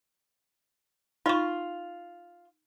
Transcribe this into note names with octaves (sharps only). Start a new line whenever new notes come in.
D#4 F4 C#6